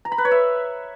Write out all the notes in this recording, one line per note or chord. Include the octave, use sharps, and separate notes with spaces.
A#5
B5
B4
C#5
E5